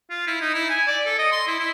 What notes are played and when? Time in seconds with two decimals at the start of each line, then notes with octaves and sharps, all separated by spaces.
0.10 F4
0.27 E4
0.41 D#4
0.54 E4
0.70 G#5
0.87 D5
1.06 A4
1.19 D#5
1.32 C6
1.47 E4
1.59 E4